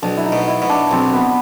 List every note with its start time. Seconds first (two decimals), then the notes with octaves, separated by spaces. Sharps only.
0.02 B1 D4
0.17 E4
0.25 D#4
0.32 B2
0.48 E4
0.62 B2
0.70 D4
0.91 B1 C4
1.13 B3